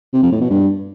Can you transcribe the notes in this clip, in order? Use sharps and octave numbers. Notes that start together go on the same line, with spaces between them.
C3
F2
A2
B2
G2